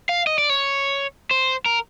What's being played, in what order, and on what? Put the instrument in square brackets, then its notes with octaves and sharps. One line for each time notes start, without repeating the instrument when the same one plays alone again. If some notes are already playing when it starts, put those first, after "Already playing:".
[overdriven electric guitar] F5
D#5
D5
C#5
C5
A#4